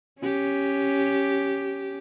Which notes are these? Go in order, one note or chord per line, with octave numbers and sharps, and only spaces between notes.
C#4 G4